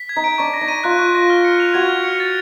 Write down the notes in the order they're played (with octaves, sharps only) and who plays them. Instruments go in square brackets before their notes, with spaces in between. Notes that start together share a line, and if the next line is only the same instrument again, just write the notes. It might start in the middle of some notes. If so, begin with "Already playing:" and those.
Already playing: [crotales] B6
G#6
[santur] D#4
[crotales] D7
[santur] D4 [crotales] C#6
[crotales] A#6
[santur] D#4
[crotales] D#7
[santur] F4 [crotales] F#6
[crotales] C#6
A#6
F6
C#7
F7
[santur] F#4 [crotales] G#6
[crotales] F6
C#7
A6